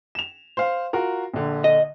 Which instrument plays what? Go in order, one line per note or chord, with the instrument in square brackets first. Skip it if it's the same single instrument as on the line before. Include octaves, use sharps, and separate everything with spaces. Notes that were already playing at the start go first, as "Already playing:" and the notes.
[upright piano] E7 F7
C5 F5
F4 F#4 A#4
A#1 D3
[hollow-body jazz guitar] D#5